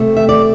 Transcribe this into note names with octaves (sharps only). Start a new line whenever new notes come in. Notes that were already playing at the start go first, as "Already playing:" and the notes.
Already playing: C3 A3 C4
E5
D5